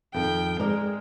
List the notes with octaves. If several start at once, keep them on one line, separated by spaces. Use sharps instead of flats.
F2 D#3 G5
G#3 A#4 D5